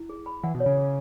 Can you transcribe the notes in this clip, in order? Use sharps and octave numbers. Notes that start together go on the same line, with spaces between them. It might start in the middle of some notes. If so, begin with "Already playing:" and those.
Already playing: E4
G#4
B5
E3 F#5
B2
C#5
C#3
G#4